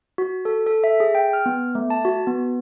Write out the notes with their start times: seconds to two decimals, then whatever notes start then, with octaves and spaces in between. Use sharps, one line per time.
0.18 F#4
0.45 A4
0.66 A4
0.84 E5
1.00 G#4
1.15 G5
1.33 F6
1.46 B3
1.75 A3
1.90 A5
2.05 F#4
2.27 B3